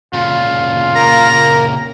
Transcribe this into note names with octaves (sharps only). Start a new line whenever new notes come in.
A#2 C#3 F4
A#3 A#4 A#5